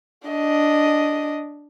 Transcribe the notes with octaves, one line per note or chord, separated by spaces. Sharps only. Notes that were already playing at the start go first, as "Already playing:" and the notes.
D4 D#5